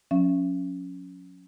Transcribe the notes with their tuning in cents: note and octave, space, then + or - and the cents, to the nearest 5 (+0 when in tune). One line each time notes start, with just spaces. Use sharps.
F#3 -45 C#4 +0 E5 +35